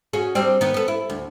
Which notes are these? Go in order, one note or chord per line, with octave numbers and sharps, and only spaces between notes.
C#4 F#4 G#4
G3 C4 D4
D#3 B3
B3 A4
E4
D2